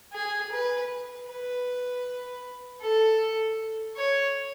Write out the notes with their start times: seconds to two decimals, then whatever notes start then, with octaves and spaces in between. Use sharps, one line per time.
0.13 G#4
0.52 B4
1.28 B4
2.82 A4
3.97 C#5